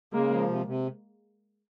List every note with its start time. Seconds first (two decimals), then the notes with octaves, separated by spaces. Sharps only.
0.13 C#3 G#3 A#3
0.31 F3
0.47 C3
0.66 C3